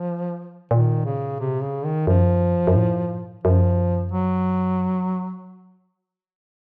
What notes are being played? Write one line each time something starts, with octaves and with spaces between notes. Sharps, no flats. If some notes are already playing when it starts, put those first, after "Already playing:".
Already playing: F3
A#2 D#3
C#3
C3
C#3
D#3
F#2 F3
F#2
A2
F#2 F3
F#3